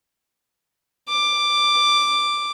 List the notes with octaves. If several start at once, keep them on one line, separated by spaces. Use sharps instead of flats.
D6